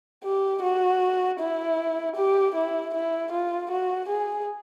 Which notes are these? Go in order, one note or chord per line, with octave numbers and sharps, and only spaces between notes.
G4
F#4
E4
G4
E4
E4
F4
F#4
G#4